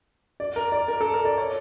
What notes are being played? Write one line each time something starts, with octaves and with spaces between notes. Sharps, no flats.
D5
A#4
D5
A#4
A4
A#4
D5
C#5